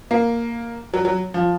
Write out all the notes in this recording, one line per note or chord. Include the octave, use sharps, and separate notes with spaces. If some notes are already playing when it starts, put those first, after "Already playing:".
A#3
F#3
F#3
F3